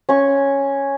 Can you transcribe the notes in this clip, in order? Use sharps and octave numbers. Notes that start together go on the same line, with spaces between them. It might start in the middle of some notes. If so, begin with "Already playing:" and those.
C#4 C#6